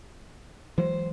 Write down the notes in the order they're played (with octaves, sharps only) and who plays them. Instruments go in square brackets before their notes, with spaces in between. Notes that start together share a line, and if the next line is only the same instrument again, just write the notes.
[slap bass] E3 F#3 G#3 [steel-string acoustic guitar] C5